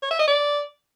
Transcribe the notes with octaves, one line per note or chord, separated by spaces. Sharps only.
C#5
E5
D#5
D5